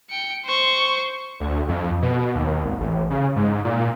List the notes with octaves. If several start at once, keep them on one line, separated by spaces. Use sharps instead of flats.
G5 C#7
C5 C#6
D2
F2
B2
D#2
G#1
A1
C#3
G#2
A#2